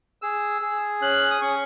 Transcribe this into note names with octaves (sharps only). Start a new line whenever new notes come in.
G#4 E6
G#4
C#4 F#6
D#6
C#4 C#6